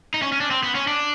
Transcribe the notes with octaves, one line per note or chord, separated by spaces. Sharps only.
D#4
C#4
C#4
D4
C4
B3
C#4
D4